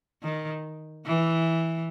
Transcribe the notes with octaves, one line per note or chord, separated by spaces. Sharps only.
D#3
E3